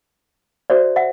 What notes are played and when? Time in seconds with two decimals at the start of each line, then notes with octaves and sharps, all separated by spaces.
0.70 F#4 A4 C5 D5 E5
0.96 E5 F#5